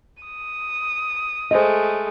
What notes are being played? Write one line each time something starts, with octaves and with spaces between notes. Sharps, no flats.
D#6
G#3 A3 C5 D#5